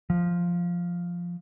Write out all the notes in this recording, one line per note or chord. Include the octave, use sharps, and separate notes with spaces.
F3